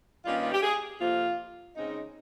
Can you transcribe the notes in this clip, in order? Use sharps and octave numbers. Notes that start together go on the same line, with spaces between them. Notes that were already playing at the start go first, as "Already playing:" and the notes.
G2 D#3 G3 A#3 C#4 F4
F4
G4
G#4
F2 C3 F3 A#3 F4
C#3 G#3 C4 D#4